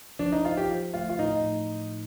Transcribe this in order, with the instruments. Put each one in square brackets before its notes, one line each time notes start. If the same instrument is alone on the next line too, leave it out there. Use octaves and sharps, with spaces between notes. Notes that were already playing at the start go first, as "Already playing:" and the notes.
[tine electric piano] F3 [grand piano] D4
[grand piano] D#4
[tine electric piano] F3 [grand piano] F4
[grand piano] G4
[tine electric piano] F3
[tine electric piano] A3 [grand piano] F4
[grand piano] F4
[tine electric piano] A2 [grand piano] D#4
[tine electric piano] A2